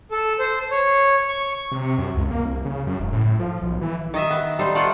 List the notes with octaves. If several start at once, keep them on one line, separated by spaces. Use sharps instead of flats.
A4
C5
C#5
C#6
C3
F#2
C#2
A#3
C2
C#3
F#2
E1
A2
F3
B1
E3
D#3 D#5 E5
B3
G3 D#4 A4 C5
A3 F4 F#5 G5